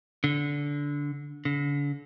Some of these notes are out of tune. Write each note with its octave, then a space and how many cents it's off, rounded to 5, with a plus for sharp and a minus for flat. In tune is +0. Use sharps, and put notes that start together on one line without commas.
D3 -15
D3 -40